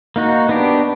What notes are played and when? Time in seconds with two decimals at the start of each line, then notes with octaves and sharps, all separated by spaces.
0.16 A#3 D#4 F#4
0.49 B3 D4 G4